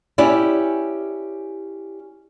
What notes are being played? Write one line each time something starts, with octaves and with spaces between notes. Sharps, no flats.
C#4 E4 G4 C#5 D5